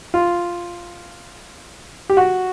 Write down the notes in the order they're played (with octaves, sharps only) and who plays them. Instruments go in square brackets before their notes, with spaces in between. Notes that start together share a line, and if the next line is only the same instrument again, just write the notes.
[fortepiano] F4
G4
F#4